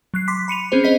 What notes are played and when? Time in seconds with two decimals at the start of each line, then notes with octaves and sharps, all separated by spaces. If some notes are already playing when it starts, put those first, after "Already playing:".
0.14 F#3 F#6 C7
0.28 C6 D6 B6
0.48 B5 C#7 D#7 F7
0.72 C4 C#4 G#4 C5
0.84 C5 D#5 B6